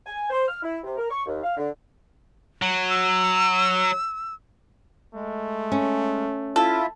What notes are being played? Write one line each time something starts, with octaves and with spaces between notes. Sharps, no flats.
G#5
C5
F6
E4
C3
A#4
C#6
D#2
F5
D3
F#3
E6
G#3 A3
C#4
E4 F4 A4 E5